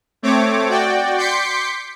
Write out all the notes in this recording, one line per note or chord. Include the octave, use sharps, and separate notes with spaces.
A3 C4 C#5 D6
F#4 D5 G5
C6 D6 G6 B6 C#7